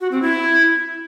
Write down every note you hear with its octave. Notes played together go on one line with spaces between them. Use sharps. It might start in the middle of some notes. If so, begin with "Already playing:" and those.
F#4
C4
E4